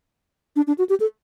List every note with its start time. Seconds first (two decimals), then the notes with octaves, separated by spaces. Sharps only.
0.56 D4
0.67 D4
0.78 F#4
0.89 G4
1.00 A4